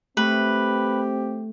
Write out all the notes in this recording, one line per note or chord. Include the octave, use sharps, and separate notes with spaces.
A3 C4 G4 B4